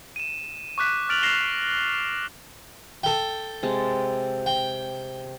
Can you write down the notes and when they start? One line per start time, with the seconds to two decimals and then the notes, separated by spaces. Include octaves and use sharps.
0.16 D#7 E7
0.78 C#6 D6 F#6 B6
1.09 F6 A6 D7 F7 F#7
1.22 F6 A#6 C7 E7 F7 G7
3.04 A4 G5
3.63 C3 G#3 A5
4.46 G5